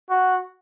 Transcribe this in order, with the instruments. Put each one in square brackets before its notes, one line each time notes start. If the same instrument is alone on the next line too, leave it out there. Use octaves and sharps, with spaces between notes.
[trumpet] F#4